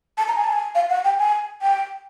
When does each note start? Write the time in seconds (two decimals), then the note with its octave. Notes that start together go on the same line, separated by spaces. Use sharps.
0.18 A5
0.28 A#5
0.36 G#5
0.44 A5
0.53 G#5
0.75 F5
0.90 F#5
1.05 G5
1.19 G#5
1.62 G5